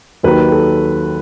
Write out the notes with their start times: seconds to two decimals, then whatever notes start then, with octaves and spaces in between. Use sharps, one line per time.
0.23 D#2 D#3 F#3 B4
0.52 A4